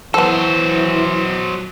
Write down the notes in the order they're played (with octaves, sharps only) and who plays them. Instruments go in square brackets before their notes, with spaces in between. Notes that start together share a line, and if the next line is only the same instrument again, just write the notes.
[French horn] E3 [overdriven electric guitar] F#3 C5 [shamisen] B3 A4